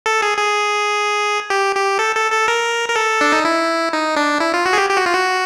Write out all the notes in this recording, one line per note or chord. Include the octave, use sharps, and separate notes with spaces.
A4
G#4
G#4
G4
G4
A4
A4
A4
A#4
A#4
A4
D4
D#4
E4
D#4
D4
E4
F4
F#4
G#4
G4
G4
F#4
F4
F#4